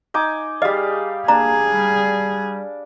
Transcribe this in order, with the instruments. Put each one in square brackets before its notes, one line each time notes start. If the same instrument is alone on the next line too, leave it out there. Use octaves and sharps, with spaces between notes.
[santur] D#4 G#5 D6
[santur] G3 F5 [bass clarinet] G#4 [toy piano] D#5
[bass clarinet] A#3 [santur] D4 [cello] G#4 [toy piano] A#5
[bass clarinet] G3